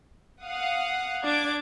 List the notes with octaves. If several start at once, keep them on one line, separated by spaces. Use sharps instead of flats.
F5 F#5 D#6
D4 D6 G#6